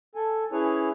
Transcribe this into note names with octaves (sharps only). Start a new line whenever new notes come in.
A4 G#5
C#4 E4 G#4 B4 C#5 G#5